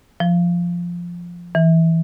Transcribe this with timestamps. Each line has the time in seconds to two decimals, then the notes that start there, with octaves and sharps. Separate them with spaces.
0.20 F3
1.55 E3